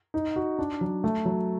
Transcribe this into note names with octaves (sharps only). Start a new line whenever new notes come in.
D#4
F#4
D4
F#3
A3
F#3